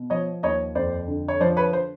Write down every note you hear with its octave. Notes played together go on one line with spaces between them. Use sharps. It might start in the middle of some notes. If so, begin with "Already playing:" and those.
Already playing: B2
F3 C#5 D#5
D#2 C#5 D#5
F2 C5 D5
D3
C#5
F3 C5 D5
B4 C#5
C5